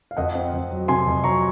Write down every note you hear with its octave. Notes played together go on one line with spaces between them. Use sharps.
F5
F2 D#5 F#5
C4
F2
F#3
C3 G#5 C6
F2
F#3 A#5 C#6